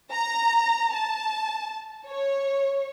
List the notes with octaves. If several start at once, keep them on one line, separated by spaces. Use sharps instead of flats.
A#5
A5
C#5